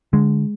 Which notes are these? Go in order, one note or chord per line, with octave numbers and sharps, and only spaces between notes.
D3 G#3